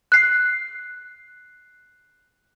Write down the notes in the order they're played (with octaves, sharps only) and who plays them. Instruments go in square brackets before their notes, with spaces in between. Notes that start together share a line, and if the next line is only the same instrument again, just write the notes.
[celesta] F#6 C7